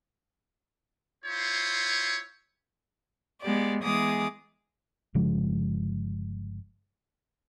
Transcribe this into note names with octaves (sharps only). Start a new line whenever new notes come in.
E4 F4 C5 C#5
G#3 B3 G4 D5
E3 G#3 B3 G#4 D6 D#6
G1 C#3 F3 G#3